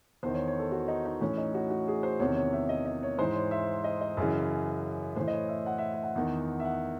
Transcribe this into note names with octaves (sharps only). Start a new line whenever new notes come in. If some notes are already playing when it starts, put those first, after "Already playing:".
E2 D#3 C5
C#5
C#5
A4
F#4
D#4
D#4
A2 E3 C#4
D#4
F#4
F#4
G#4
C5
E2 C3 D#3 C#5
C#5
E5
D#5
D#5
C#5
G#2 E3 C5
C#5
E5
D#5
D#5
F#2 C#3 E3
A2 E3 C5
D#5
C#5
E5
F#5
E5
E5
F#5
E2 D#3
E5
F#5